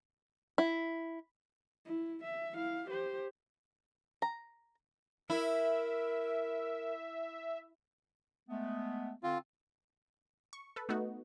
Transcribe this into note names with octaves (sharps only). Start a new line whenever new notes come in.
E4
E4
E5
E4 F5
G4 C5
A#5
E4 A#4 E5
G#3 A3 B3
D3 C4 F4
C#6
A4 B4
A3 B3 D#4 F#4